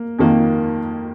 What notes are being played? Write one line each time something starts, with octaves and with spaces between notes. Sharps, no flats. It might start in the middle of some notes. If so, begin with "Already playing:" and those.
Already playing: A#3
F2 D#3 A#3